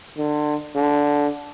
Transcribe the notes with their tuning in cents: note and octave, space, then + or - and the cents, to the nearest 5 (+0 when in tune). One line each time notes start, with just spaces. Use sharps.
D3 +25
D3 -10